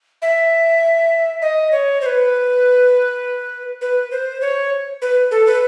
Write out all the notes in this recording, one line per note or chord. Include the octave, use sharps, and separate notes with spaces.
E5
D#5
C#5
C5
B4
B4
C5
C#5
B4
A4
B4